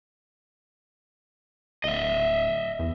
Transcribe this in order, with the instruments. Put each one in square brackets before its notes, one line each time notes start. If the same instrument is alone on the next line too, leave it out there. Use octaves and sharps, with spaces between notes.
[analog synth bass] D1 [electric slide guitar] D#5 E5
[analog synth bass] E2